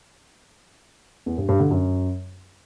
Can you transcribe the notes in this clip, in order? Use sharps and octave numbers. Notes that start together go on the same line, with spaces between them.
E2
G2
G2
D3
F#2